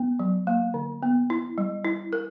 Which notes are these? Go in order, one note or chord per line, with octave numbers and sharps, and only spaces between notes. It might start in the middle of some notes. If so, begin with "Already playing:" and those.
Already playing: B3
F#3
A#3
D3
B3
E4
G3
E4
A#4